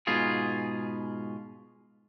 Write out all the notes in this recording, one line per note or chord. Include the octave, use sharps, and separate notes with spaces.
G#2 B2 F4 G#4